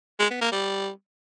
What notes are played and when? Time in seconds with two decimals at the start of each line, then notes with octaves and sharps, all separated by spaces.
0.20 G#3
0.30 B3
0.41 A#3
0.52 G3